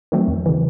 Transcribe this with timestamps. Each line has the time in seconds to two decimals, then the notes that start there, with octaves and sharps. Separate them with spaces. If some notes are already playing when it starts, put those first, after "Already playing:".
0.12 D#3 F#3 A3 C4
0.28 E2
0.46 C#3 E3